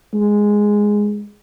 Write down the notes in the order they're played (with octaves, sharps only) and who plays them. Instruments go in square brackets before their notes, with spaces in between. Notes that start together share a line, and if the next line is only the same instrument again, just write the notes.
[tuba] G#3